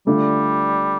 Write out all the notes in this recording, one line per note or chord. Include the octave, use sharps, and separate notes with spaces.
D3 G3 A3 D4 F4 A4